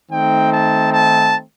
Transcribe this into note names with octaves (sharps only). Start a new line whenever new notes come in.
D#3 A3 C4 D#4 G5
A5
A5